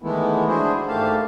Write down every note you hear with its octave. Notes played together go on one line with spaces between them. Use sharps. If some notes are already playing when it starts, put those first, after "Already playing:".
D#3 E3 G#3 A3 B3 E4
D4 E4 F#4 G#4 C5
G#2 A3 A#3 G4 F5 A5